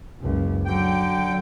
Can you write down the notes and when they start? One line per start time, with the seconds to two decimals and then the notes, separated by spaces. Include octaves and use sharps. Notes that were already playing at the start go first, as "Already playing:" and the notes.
0.21 F#1 C#2
0.66 D3 F#3 G5